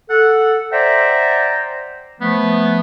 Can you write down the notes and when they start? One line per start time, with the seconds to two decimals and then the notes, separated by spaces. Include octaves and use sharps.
0.10 A4 F#5
0.72 C5 D5 E5 F#5 G5 A#5
2.19 F3 A3 B3